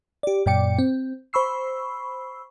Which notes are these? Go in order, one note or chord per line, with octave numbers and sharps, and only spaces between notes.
G4 D5
F#2 A#2 D5 G5 D6 C#7
C4
C5 B5 C#6 E6 C7